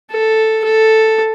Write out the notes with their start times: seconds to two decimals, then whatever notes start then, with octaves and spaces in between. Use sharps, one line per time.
0.12 A4
0.65 A4